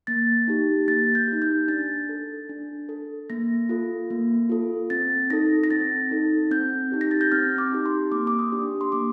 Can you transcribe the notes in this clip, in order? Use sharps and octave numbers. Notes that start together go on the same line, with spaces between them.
A#3 A6
D#4 G4
A#3 A6
G6
D#4 G4
G6
D4 A6
A4
D4
A4
A#3 A#6
F4 A4
A#3
F4 A4
C4 A6
D#4 A4 A#6
A#6
C4 A6
D#4 A4
C4 G6
D#4 G4
A#6
A6
G6
C4 F6
D6
D#4 G4
C6
A#3 D6
D6
D#6
D4 G4
C6
A#3 D6